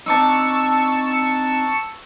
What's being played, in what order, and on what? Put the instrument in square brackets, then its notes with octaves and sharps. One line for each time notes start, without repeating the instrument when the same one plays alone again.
[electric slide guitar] C4 D4 D#4 [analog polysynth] A5 C#6 E6